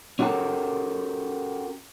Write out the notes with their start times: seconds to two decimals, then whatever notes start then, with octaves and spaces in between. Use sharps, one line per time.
0.19 C#4 F#4 G4 A4 A#4